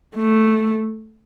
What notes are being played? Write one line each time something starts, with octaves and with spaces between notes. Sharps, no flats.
A3